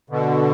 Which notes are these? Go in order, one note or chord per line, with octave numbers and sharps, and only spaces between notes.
B2 D3